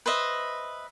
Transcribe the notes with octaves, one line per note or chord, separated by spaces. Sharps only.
B4 C5 D#5 E5